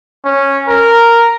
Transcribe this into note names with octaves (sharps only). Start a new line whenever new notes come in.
C#4
A#4